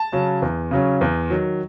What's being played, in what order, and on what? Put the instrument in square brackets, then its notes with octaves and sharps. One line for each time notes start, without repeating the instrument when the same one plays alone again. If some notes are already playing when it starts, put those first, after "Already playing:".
Already playing: [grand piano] A5
[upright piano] C#3 F#3 C#4
E2
C#3 F#3 C#4
E2
D#3 F#3